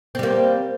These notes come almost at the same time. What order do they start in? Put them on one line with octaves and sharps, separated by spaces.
C4 G3 A#3